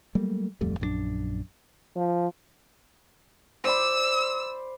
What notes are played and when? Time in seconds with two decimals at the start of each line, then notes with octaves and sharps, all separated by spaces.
0.15 F#3 G3 A3 A#3
0.61 D1 F2 G3 A3
0.80 A#1 F#2 G#3 D4
1.95 F3
3.64 C5 D5 B5 E6